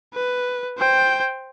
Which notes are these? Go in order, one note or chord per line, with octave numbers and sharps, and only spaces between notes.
B4
C5 G5